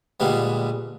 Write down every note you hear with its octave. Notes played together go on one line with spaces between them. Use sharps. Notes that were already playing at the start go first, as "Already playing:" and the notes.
A#2 D3 G3 G#3 B3